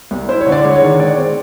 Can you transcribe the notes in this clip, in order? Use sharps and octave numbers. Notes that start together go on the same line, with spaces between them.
C2
E4 C5
C#5
D3
D5
G#3 C#5
C#5
D#3
G#3 D5
C4